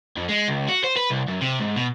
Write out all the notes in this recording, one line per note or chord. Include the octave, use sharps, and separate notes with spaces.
F2
G#3
C#2
F#4
C5
B4
C2
F#2
C3
G#2
B2